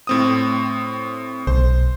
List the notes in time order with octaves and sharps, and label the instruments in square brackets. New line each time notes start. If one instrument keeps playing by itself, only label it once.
[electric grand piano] A2 C4 D#6
[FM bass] B1 [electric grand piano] C5